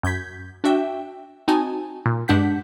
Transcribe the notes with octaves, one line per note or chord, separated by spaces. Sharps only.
F#2 G6 G#6 B6
D4 F#4 E5 G5
C4 D#4 F#4 G#5 A5
A#2
G2 G#3 D4 F#5 G6 B6